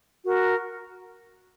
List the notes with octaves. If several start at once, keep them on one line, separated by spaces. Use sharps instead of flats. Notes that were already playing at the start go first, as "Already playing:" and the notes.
F#4 A#4